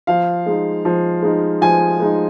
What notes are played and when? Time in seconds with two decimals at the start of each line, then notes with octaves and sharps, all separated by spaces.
0.07 F3 F5
0.46 G#3 D#4
0.85 F3
1.22 G#3 D#4
1.61 F3 G#5
2.00 G#3 D#4